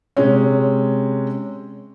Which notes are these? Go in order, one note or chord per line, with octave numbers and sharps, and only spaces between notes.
C3 G#3 C#4